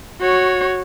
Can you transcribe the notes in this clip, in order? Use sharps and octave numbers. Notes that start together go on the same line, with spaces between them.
F#4 C#5